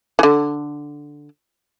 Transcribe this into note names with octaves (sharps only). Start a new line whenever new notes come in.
D3 E3